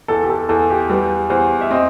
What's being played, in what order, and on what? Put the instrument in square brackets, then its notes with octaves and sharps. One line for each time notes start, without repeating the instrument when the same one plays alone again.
[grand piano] E2 [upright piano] A4
[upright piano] G4
A4
[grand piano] E2 [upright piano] A4
[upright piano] G4
[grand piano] G3 [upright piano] B4
[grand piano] E2 [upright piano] C5
[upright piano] E5
[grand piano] C4 [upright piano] D#5